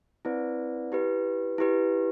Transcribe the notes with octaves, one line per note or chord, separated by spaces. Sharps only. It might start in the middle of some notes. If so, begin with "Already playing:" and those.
C4 E4 B4 D5
E4 G4 B4
E4 G4 B4